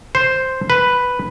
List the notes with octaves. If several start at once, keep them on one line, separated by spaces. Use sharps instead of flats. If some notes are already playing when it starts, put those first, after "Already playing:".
C5
B4